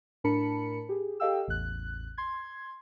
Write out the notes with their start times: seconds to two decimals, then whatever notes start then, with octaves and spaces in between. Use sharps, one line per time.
0.24 A2 D4 A#4 A5 B5 C#7
0.89 G4 G#4
1.20 G4 A4 D#5 F5 G5 E6
1.48 A1 E2 F#6
2.18 C6 G#6